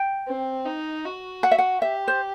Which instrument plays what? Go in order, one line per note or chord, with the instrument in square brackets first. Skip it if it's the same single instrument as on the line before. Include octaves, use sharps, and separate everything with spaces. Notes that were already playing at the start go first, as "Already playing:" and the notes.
Already playing: [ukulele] G5
[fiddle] C4
D#4
F#4
[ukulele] F#5
E5
F#5
[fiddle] G4 [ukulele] E5
[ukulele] C5